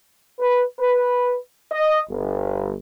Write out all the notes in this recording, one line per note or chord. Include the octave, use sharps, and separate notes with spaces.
B4
B4
D#5
G1